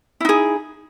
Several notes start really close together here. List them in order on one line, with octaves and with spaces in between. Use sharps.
E4 D#4 G#4